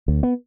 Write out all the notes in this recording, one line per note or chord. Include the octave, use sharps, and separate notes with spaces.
D2
B3